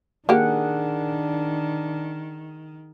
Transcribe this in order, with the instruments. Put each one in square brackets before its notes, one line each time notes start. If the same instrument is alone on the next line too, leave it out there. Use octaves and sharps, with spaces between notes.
[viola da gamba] D#3 [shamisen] A#3 G4 [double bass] D4 [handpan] G#4 F#5